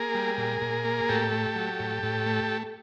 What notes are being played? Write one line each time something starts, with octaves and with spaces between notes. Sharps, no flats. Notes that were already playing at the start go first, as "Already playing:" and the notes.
Already playing: A#3 G#4 A#4
G3
A#2
A#2
A#3
A2 G4 A4
A3
F#3
A2
A2
A3